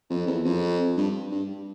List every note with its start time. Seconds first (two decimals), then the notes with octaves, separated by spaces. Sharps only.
0.10 F2
0.27 E2
0.44 F2
0.97 G2
1.31 G2